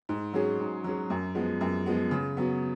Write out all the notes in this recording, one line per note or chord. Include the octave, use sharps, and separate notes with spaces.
G#2
F#3 C#4 G#4
G#2
F#3 C#4 G#4
F#2
F3 G#3 B3
F#2
F3 G#3 B3
C#3
F#3 B3